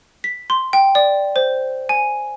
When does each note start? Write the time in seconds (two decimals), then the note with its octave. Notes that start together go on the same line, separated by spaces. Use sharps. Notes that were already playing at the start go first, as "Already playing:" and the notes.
0.24 B6
0.50 C6
0.73 G5
0.95 D5
1.36 C5
1.89 G#5